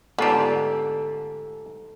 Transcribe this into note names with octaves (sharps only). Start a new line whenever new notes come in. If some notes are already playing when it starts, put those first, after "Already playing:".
G#2 D3 B3 D4 F4 G4 A4